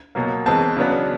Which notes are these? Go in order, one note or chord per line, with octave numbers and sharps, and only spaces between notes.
B2 F#3 A#3
E3 G#3 C4 A5
C#3 F#3 B3 D4